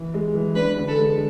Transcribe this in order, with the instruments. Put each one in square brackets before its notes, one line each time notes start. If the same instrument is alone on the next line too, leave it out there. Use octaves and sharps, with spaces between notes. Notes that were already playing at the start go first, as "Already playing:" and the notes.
Already playing: [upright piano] E3
G#3
E3
[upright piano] D4 [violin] B4
[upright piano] D3
[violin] A4
[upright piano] G#3